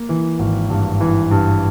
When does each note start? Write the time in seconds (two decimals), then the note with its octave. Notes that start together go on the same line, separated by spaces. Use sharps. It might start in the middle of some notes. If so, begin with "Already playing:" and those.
Already playing: A#3
0.09 E3
0.39 G#1
0.70 G2
1.00 E3
1.31 G2